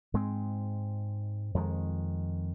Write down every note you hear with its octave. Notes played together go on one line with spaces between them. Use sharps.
G#2 G#3 C4
F2 D#3 G#3